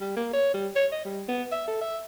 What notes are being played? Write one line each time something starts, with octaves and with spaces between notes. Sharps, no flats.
G3
A#3
C#5
G3
C#5
D#5
G3
B3
E5
A4
E5